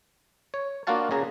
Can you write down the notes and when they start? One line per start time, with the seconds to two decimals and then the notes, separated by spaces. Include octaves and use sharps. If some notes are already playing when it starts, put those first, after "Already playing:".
0.54 C#5
0.87 A#3 D4 F4 F#4 F5 A5
1.11 C#3 G#4 A#5